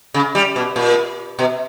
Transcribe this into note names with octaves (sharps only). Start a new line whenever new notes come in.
C#3
G3
B2
A#2
B2